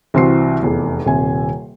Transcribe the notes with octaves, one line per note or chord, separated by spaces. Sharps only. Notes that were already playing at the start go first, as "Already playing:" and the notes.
C2 E3 C4 F#4 C7
F1 E2
D#1 C3 G#5